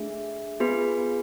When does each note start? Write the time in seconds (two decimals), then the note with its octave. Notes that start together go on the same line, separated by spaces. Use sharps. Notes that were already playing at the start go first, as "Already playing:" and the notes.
Already playing: A3 D4 G#4 E5
0.60 B3 F4 G#4 B4